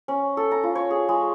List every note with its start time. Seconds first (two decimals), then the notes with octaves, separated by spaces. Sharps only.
0.08 C#4
0.37 A4
0.51 A#5
0.63 F4
0.75 C#5
0.90 G#4
1.09 G#3